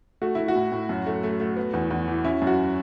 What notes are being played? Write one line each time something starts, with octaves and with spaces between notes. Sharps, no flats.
A3 F#4
A3 E4
F#4
A2
A2
F#2
A3
A3
A3
B3
E2
E2
E3
C#4 E4
F#2
F#4